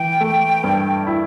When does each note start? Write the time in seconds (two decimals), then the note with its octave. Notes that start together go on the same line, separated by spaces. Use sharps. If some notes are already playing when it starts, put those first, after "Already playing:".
Already playing: E3 G5
0.20 A3
0.64 G2
1.07 E4